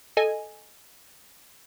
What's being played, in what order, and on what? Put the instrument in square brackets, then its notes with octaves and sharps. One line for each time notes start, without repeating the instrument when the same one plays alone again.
[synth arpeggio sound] A4 D#5 G#5